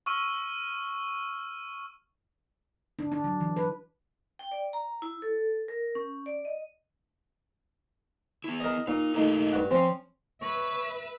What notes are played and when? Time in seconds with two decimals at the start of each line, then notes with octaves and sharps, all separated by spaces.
0.06 C#6 E6 F6 D#7
2.99 D4
3.12 D4
3.24 F#3
3.40 E3
3.56 B4
4.39 G5
4.51 D5
4.73 A#5
5.02 E4
5.22 A4
5.68 A#4
5.95 C#4
6.26 D5
6.45 D#5
8.44 B3 E4
8.60 A#4 D#5
8.87 A#2 D#4
9.15 A3 D#4 E4 G4 A#4 D#5
9.53 G2 F#4
9.71 F3 C4 C#4 C6
10.42 B4 C#5 E5